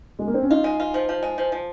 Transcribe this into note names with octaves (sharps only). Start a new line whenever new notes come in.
G#3
A#3
C4
C#4
D#4 F4
G#3
F4
F3
F3
G#3
F3
F3